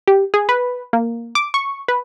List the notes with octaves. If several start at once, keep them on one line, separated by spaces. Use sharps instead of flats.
G4
G#4
B4
A#3
D6
C#6
B4